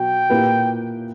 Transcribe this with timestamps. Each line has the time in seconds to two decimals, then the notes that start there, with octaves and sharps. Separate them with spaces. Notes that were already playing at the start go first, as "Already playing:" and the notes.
Already playing: B2 F#3 F#4 G5
0.30 A#2 A#3 E4 G4 B4